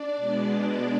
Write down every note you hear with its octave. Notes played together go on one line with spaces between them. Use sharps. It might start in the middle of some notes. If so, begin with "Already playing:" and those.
Already playing: D4 D5
B2 G#3 B3